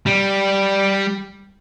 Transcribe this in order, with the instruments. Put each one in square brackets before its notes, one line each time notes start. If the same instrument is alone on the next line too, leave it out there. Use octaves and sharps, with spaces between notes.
[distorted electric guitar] G3